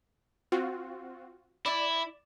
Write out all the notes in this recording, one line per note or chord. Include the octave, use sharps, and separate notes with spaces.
C4 F4 F#4
E4 D5